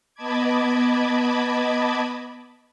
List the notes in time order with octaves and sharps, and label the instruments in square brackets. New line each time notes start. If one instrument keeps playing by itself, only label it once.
[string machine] B3 D#5 A5 B5 D6 G#6